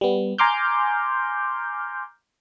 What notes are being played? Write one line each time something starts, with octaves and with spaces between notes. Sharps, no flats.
G3 B3
G#5 A#5 C6 D6 F6 G6